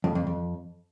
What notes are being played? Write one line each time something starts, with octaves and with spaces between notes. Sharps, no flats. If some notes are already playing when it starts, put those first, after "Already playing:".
F2
F2
F2